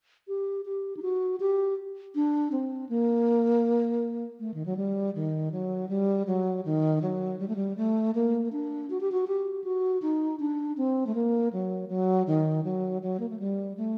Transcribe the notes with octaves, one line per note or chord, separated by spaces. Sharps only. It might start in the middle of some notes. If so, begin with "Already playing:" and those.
G4
G4
D#4
F#4
G4
D4
C4
A#3
A3
D#3
F#3
G3
D#3
F#3
G3
F#3
D#3
F#3
G3
A3
G3
A3
A#3
D4
F#4
G4
F#4
G4
F#4
D#4
D4
C4
A3
A#3
F#3
F#3
D#3
F#3
F#3
A#3
A3
G3
A3